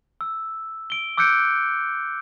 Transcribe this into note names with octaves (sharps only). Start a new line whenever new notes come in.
E6
D7 G7
D6 E6 F#6 G6 C#7 D7